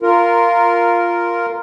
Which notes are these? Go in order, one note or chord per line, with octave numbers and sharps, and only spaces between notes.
F4 A#4